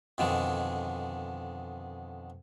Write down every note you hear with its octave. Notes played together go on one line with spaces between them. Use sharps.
F2 B2 D3 D#3 G#3